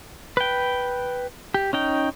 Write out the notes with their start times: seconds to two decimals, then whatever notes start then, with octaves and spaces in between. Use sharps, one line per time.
0.37 B4 G5
1.54 G4
1.73 C#4 D#4 G5